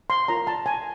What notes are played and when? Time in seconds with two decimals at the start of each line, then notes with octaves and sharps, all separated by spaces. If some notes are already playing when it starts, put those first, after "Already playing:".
0.10 C6
0.28 F4 A#4 C#5 A#5
0.47 A5
0.66 G#5